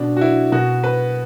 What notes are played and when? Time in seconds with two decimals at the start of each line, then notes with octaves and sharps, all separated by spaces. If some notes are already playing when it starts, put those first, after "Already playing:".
Already playing: B2 D4
0.17 F#4
0.21 E4
0.52 B2 F#4
0.84 B4